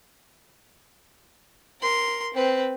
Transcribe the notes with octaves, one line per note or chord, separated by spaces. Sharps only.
A#4 C6
C4 B4